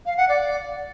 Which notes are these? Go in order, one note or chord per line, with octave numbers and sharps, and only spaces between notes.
F5
F#5
D5